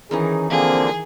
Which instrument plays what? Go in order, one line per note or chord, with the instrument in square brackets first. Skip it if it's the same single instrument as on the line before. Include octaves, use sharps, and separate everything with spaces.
[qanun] D#3 E3 D#4 [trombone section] C#4 G#4
[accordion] D3 F3 A#3 [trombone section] C4 [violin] G#4